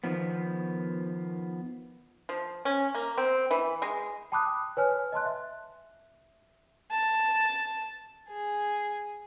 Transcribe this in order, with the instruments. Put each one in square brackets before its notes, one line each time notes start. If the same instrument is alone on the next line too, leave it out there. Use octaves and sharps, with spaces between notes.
[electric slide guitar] D#3 F3 B3
[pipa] F3
C#4
A#3
C4
E3
G#3
[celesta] G5 A5 B5 D6 D#6 F#6
B4 C#5 G#5 F6
D#5 A5 C6 F#6
E5
[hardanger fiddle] A5
G#4